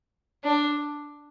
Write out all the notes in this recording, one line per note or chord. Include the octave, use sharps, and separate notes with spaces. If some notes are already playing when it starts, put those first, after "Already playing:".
D4